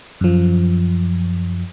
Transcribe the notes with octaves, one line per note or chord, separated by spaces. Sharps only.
F#2 F3